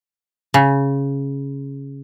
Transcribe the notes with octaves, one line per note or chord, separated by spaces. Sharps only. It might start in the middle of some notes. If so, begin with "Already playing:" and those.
C#3